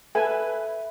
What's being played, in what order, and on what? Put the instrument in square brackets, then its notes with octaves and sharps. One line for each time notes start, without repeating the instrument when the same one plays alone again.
[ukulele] A4 [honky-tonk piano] B4 [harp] E5 [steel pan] G#5